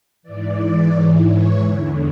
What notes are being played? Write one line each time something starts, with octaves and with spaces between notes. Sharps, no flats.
G#2 E3 D5
D5
G#2 E3 C#5
C#5
E2 D3